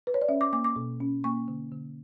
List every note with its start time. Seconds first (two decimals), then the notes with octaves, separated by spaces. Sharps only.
0.07 B4
0.14 C#5
0.22 D5
0.28 C#4 E5
0.41 D6
0.53 A#3 D6
0.64 D6
0.76 B2
1.00 C#4
1.24 A#3 C#6
1.48 D3
1.72 D3